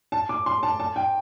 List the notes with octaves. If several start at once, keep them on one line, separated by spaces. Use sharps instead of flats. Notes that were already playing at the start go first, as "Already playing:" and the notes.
A5
D6
C6
A5
A5
G5